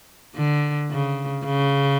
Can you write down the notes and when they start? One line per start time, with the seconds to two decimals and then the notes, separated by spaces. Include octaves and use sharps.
0.36 D3
0.91 C#3
1.45 C#3